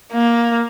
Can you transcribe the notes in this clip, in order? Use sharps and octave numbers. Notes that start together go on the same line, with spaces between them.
A#3